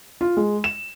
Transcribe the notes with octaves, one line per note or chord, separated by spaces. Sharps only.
F4
G#3
E7